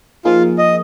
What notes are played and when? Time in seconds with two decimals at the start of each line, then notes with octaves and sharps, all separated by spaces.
0.25 F3 A#3 D#4 F4 G#4
0.58 D#5